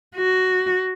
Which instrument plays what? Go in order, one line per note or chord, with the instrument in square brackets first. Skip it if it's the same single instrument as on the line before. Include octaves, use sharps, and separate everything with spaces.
[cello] F#4